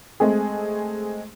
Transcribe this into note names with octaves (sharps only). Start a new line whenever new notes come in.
G#3 A3 C4 G#4